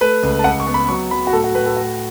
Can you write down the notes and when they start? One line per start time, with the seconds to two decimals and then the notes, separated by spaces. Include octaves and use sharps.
0.01 A3 B4
0.23 C#2
0.39 A5
0.44 C#2 F#5
0.60 C#6
0.67 B3
0.74 B5
0.88 F#3 C#6
1.11 F#3 B5
1.27 F#4
1.32 A2 A4
1.44 F#4
1.55 A2 B4
1.66 A4
1.76 A3 F#4